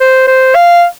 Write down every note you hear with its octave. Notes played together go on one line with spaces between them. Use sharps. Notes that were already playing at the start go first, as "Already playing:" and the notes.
C5
C5
F5